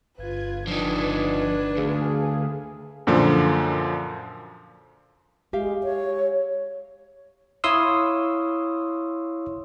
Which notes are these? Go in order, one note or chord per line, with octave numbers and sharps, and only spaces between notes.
G1 F4 B4 G#6
F3 D4 D#4 B4
D2 G#4 F5
F#2 A#2 D3 F3
G#3 G4 E5 F5
C#5
E4 C#5 F5 C6 D#6 E6